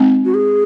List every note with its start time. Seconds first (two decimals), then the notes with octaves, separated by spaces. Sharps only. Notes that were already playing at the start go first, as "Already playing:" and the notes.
Already playing: G#3 C4 D#4
0.25 F#4
0.34 G#4